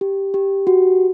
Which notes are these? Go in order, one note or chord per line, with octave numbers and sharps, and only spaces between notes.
G4
G4
F#4